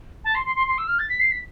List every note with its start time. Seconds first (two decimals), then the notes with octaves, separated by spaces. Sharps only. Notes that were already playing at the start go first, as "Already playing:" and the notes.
0.25 A5
0.35 C6
0.46 C6
0.56 C6
0.67 C6
0.78 E6
0.88 F6
0.99 A6
1.09 B6
1.20 C7
1.31 B6